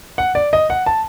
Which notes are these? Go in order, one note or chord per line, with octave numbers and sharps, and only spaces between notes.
F#5
D5
D#5
F#5
A5